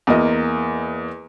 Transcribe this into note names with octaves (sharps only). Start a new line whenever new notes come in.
E2 A#3 D#5